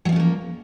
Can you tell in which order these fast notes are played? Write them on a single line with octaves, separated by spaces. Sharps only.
F#3 F3 C#4 A3 A#3